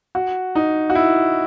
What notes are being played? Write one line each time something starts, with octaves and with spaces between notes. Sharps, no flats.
F#4
D#4
F#4
E4